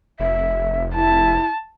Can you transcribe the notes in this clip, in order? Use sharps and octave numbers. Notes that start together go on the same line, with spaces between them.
F1 E5
E4 A5